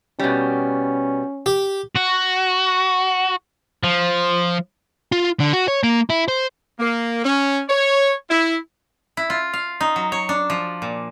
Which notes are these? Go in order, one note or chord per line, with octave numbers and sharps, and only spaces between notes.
B2 G3 C#4
G4
F#4
F3
F4
D3
F#4
C#5
A#3
E4
C5
A#3
C#4
C#5
E4
E4
F4
F5
D#4
F#3
C#5
D4
F3
A#2